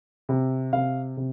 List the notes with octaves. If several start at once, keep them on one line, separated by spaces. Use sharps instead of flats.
C3
C3 F5
C3